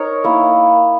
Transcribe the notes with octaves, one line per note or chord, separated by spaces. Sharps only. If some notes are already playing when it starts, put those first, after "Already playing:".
Already playing: D#4 A#4 C#5
A#3 E4